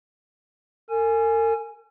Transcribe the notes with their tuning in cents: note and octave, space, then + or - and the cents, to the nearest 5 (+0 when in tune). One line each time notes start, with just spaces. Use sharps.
A#4 -45 G#5 +0